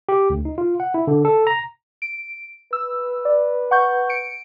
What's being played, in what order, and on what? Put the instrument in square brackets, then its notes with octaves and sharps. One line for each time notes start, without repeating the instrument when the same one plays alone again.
[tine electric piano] G4
D2
D#4
F4
F#5
E4
D3
A4
A#5
[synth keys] D7
[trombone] B4 [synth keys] E6
[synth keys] D5
F#5 C#6 G6
C#7 D7